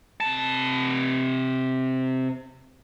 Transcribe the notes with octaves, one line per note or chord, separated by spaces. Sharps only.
C3 A5